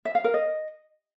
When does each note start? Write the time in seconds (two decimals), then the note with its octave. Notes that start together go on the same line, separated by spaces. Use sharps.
0.05 E5
0.15 F5
0.24 A#4
0.34 D#5